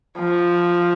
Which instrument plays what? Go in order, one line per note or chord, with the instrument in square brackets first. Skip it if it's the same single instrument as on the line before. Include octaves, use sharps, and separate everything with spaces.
[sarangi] F3